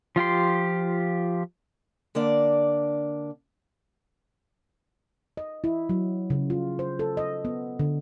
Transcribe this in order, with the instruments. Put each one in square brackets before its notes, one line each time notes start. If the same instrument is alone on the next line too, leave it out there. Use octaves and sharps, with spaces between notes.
[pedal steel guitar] F3 F4 G4 C6
[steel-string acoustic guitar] D3 A#3 D4 D5
[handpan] D#5
E4
F#3
C#3
F4
C5
A4
D#5
B3
D3